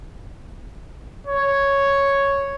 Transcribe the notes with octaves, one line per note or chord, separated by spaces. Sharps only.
C#5